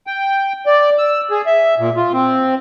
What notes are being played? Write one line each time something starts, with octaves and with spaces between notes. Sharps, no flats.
G5
D5
E6
G#4
E5
A#2
F4
C4